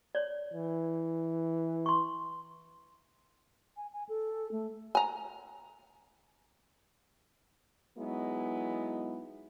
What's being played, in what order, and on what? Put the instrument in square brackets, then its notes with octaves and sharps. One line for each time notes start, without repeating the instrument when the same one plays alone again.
[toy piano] C#5 D5
[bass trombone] E3
[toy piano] C6 C#6
[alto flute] G#5
G#5
A4
A3
[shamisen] G#5 A#5
[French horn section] F#3 G#3 B3 D#4 E4